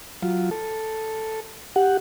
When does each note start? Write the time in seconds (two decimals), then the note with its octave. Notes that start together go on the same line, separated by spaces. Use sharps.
0.23 F#3 F4
0.51 A4
1.76 G4 F#5